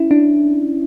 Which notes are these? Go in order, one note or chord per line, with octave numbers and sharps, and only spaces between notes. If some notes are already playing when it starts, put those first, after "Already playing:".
Already playing: C#4 E4
D4